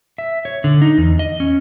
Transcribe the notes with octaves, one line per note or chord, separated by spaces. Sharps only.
E5
C#5
D3
D#4
E2
D#5
C#4